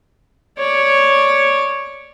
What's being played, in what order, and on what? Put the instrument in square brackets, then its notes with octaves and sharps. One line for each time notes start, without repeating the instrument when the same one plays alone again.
[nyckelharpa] C#5 D5